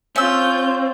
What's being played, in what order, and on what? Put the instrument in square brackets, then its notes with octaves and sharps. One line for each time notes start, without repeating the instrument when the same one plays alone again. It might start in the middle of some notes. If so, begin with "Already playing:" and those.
[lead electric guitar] C4 [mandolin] C#4 E6 [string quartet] F4 G6